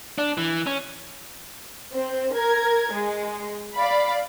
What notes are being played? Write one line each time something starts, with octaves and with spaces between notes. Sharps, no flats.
D4
E3
C#4
C4
A#4 G#6
G#3
D5 F5 B5